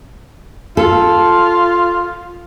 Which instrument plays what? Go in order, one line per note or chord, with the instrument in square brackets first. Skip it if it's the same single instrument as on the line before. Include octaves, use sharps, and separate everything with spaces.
[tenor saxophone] F4 [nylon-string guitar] A4